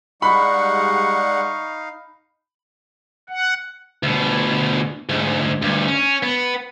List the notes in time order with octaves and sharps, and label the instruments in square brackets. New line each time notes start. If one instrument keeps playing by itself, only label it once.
[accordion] G3 G#3 F#5 [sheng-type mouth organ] D#4 F5 [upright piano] B5 [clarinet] C#6
[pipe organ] F#5
[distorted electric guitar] D2 B2
D2 G#2
D2 G2
C#4
B3